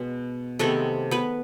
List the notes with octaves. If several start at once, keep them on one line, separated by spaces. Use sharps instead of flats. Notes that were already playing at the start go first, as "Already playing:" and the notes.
Already playing: B2 G#3 B3
C3 D#3 G#3 A3 B3 A4
B3 B4